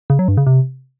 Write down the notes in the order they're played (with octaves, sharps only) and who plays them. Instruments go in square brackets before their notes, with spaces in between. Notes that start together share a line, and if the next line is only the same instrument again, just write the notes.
[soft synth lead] C#3
F#3
G2
C#3
C3